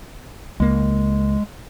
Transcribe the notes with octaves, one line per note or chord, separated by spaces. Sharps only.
C#2 G#3 A#3